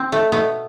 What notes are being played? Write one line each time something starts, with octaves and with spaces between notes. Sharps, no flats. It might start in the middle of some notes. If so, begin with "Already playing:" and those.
Already playing: C4
A3
B2 A3 B3